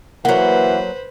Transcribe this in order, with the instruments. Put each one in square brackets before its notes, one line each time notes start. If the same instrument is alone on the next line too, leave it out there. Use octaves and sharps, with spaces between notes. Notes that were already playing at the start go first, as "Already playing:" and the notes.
[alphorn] E3 [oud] F#3 A#3 [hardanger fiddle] B4 C5 [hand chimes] F#5